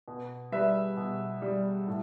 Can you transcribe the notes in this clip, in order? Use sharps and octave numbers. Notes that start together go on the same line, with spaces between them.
B2
G3 B4 E5
B2
G3
A2